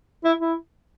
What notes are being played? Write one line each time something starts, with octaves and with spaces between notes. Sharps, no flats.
E4
E4